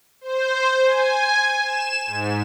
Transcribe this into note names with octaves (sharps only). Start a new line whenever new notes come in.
C5
G#5
E7
G#2